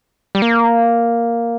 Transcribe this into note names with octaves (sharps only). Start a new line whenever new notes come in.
G3
A#3